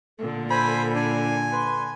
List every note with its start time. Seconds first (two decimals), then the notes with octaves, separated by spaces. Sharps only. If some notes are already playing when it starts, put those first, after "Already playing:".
0.19 A#2 D3 A4
0.51 C5 G#5 B5
0.96 D4 G#5
1.52 B4 C6